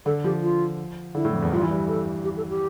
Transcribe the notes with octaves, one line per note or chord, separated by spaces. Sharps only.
D3 A4
F3 G4
F4
D3 E4
A2
F2
E2
G2 F4
E3
G3
A4
G4
A4
G4